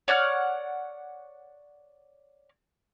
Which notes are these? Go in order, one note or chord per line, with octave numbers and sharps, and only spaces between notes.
C#5 D5 F#5 F6